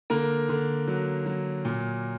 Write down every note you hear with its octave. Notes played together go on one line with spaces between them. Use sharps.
D3 A#3 A#4
D3
F#3
F#3
A#2